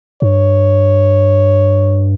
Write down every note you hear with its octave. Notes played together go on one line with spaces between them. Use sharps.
G2 C#5